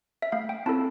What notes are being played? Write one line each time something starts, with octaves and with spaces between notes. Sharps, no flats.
E5
A3 F5
G5
C4 E4 A4 A5